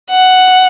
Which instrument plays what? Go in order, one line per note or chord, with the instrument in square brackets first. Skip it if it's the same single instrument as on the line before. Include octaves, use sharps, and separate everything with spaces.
[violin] F#5